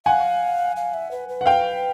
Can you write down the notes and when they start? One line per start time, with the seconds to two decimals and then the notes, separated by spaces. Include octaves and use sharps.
0.05 F5 F#5 G#5
0.76 F5
0.94 E5
1.11 B4
1.29 B4
1.41 F#5
1.46 F5 G5